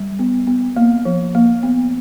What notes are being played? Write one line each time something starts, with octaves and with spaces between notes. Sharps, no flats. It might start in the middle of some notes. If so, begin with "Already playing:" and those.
Already playing: G3
B3
B3
A#3
F3
A#3
B3